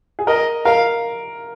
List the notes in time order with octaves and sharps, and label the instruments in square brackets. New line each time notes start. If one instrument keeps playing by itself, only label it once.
[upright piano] G#4
[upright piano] A#4 [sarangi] D#5
[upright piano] A#4 [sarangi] F5